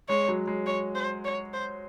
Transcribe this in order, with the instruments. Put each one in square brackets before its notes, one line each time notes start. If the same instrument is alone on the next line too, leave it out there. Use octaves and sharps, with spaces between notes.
[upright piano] G#3 [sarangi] C#5
[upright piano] F#3
G#3
[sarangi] C#5
C5
C#5
C5